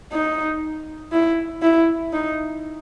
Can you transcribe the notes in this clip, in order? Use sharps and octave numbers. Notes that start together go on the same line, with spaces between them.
D#4
E4
E4
D#4